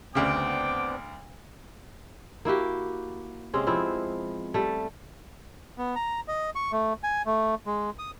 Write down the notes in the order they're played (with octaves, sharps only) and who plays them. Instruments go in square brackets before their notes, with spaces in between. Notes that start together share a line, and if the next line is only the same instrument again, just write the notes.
[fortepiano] D2 C#3 [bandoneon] B3 C4 D4 [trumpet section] G5 D6
[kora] A#3 E4 F#4 G4
C3 G#3 C4 C#4
F3 B3 C4 E4
G3 A3
[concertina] B3
A#5
D#5
C#6
A3
G#5
A3
G#3
D#6